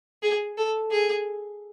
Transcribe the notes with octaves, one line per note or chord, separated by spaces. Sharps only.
G#4
A4
G#4